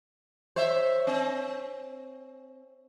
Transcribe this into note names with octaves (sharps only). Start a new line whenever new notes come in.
C5 C#5 E5
C4